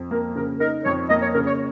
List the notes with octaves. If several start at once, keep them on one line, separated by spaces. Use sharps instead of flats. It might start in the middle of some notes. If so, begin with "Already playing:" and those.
Already playing: F2
A#3 A#4
C#3 A#4
D#4 A#4
F2 C#5
A#3 D#5
C#5
C#3 A#4
C#5